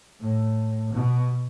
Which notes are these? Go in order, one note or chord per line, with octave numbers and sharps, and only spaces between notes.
A2
B2